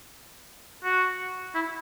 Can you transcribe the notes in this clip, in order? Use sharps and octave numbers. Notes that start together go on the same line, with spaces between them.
F#4
E4